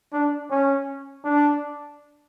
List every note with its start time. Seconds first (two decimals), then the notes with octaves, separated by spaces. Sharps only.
0.12 D4
0.50 C#4
1.24 D4